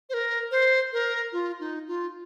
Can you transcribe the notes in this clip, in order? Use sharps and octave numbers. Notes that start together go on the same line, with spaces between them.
C5
A#4
C5
A#4
F4
D#4
F4